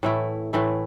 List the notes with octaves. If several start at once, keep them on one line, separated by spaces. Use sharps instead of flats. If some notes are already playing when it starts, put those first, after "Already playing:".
A2 E3 A3 E4
A2 E3 A3 E4